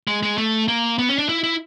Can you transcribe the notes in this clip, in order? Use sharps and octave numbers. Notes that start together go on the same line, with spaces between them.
G#3
G#3
A3
A#3
B3
C#4
D4
E4
E4